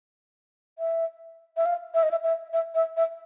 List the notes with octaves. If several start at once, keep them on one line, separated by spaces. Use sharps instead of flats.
E5
E5
F5
E5
D#5
E5
E5
E5
E5
E5